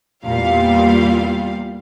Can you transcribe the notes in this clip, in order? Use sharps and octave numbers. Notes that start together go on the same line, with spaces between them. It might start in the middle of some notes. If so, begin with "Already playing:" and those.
E2 A#2 G3 F5